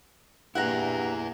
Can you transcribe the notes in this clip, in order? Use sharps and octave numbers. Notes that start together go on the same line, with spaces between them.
G2 A#2 A#3 E4 G#4 F#5 A#5